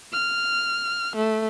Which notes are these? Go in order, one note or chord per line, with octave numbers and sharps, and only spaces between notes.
F6
A3